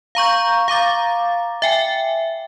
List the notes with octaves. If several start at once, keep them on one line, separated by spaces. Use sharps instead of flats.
F5 A#5 C#6 G6
F5 A#5 D6 A6
E5 G5 G#5